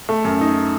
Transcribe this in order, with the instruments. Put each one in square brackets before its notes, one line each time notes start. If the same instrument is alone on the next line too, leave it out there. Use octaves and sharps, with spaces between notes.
[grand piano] A3
F#2
D#4